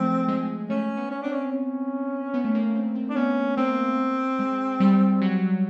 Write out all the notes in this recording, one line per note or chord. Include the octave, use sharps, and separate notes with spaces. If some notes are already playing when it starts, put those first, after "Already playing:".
Already playing: F3 G#3 A3 C4
G#3
A3 C#4
B3
C#4
C4 D4
C#4
C#4
B3
A3
A#3
C4
C4
D4
B3 C#4
A#3 C4
G#3
G3
F#3